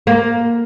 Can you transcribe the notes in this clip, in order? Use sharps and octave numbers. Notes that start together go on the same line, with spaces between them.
A#3